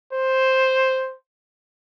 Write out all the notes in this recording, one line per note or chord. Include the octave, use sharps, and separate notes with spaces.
C5